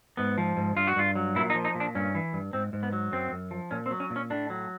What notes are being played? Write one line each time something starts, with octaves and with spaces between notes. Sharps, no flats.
G#2 B3
F3
G#2
G2 F4
F#4
G2 F4
F#3
A#2 E4
D#4
F3
D#4
A#2
D4
G2 C#4
E3
G2
G#2 C4
G#2
B3
F#3
F#2 C4
F#2
F3
A#2 C#4
C4
F#3
C#4
A#2
C#4
A2 D4
F#3